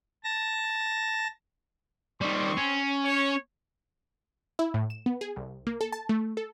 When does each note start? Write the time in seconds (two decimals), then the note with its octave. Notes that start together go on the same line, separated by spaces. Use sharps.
0.24 A5 A#6
2.21 D#3 G3 C4 C6 C#6
2.57 C#4
3.05 C#5
4.59 E4
4.74 A2
4.90 E7
5.06 B3
5.21 G#4
5.36 C2
5.67 A#3
5.81 A4
5.92 A5
6.09 A3
6.37 A4